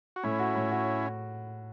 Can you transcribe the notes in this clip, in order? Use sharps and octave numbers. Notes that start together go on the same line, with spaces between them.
F#4
A2 C#4 E4
F#4
A2
F#4